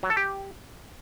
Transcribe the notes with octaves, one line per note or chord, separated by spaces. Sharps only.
F#3
A4
G4